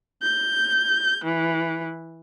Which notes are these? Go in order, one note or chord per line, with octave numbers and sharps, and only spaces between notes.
G6
E3